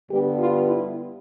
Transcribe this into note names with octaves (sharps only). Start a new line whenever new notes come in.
G2 D3 G3 B3 G4
F4
E4